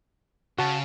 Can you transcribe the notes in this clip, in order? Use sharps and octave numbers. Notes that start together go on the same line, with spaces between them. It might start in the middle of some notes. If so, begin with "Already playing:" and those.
C#3 F#4 A5 A6